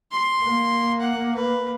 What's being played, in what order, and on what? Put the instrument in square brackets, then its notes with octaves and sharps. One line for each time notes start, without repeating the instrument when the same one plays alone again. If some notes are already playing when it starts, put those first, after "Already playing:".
[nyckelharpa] C6
[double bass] A#3
[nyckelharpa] F#5
B4